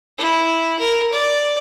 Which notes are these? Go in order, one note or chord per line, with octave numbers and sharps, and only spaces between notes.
E4
A#4
D5